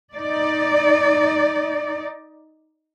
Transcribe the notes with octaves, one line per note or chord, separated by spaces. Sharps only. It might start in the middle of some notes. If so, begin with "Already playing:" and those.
D#4 D5